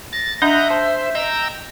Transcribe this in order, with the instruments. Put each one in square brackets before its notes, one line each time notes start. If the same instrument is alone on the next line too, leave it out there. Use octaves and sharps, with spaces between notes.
[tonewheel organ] A6 [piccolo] A#6
[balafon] D4 [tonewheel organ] D#5 F#5 A#5 [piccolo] E5 [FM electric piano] G6
[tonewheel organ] C5 [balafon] A5
[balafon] D#5 [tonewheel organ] G5 A#5 E6